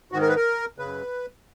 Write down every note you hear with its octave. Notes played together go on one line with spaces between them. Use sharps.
G#2 D#3 F#4
A#4
B4
A#4
F#2 C#3 B4